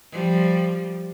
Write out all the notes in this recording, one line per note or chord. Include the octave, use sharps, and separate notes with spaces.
F3 G3